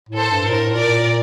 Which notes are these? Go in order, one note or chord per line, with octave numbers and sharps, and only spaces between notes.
A2
A4 C5
G2
A#2 A#4
A2
A#2 A#4 D5